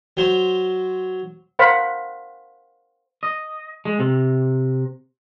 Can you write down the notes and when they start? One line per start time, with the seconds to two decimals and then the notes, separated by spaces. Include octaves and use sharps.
0.17 F#3 C5
1.59 A#4 C5 F5 F#5 B5
3.23 D#5
3.85 G#3
3.99 C3